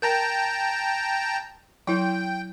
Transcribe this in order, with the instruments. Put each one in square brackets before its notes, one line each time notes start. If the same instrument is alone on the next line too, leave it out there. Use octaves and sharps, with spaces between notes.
[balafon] A#4 [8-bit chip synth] G5 A5 A#5
[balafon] F#3 E4 [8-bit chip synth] G5